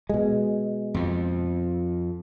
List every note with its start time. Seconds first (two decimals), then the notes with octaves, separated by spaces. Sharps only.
0.09 B2 G#3
0.94 F2 F3